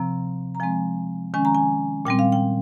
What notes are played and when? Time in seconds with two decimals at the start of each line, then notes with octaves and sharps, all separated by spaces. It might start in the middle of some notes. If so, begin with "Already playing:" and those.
Already playing: C3 F3 C4 A#5
0.55 A#5
0.60 F3 G#3 C4 G#5
1.34 D#3 G#3 C#4 G#5
1.45 A#5
1.55 G#5
2.05 A#2 G3 C4 G5
2.19 F5
2.32 G5